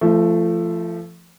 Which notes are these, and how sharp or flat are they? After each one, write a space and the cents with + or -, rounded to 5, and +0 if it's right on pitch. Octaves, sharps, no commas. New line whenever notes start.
F3 -30 A3 +0